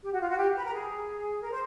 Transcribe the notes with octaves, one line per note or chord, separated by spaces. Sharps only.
G4
F#4
F4
F#4
G4
B4
A#4
G#4
A#4
C5